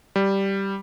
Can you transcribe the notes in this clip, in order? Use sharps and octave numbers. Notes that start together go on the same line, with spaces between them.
G3